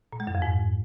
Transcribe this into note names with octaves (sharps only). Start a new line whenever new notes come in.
A#2
G#3
F#2
F2
G#2